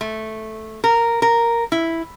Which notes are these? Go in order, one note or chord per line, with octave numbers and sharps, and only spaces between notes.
A3
A#4
A#4
E4